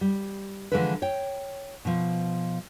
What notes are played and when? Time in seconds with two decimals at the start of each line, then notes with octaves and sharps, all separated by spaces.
0.01 G3
0.72 D3 E3 F3 G#3 A4 B4
1.02 C#5 G5
1.85 B2 F3